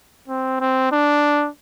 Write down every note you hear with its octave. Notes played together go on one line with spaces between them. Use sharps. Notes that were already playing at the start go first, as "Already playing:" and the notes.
C4
C4
D4